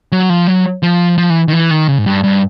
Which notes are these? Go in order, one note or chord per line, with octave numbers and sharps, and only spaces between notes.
F#3
F3
F#3
F3
F3
E3
D#3
E3
D#3
C#3
G#2
G2
G2